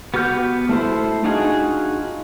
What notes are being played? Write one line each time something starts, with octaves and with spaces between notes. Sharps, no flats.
B3 F#4 G4 F6 G6
A3 E4 C5
D4 D#4 F4 F#4 G#4